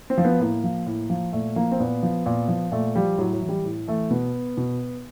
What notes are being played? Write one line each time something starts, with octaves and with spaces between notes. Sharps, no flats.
C4
F3
B3
A2 A#3
F3
A2
F3
A#2 A3
F3 A#3
C4
A#2 B3
F3
A#2
F3
A#2 A3
F3 G3
A2 F#3
F#3
E3
G3
A2
E3 A3
B2 B3
B2